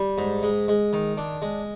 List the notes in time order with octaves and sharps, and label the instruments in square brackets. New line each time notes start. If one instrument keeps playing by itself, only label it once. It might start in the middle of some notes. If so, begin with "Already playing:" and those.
Already playing: [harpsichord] G3
G#2
G#3
G#3
D#3
D4
G#3